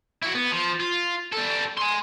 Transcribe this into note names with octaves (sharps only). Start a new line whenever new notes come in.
E4 F#4
B3
F3
F4
G3 A4
G#5 C6